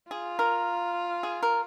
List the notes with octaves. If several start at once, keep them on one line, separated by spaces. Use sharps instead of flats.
F4 G#4
A#4
G#4
A#4